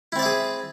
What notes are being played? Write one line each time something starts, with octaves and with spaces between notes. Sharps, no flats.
C4 E4 G#4 D5 E5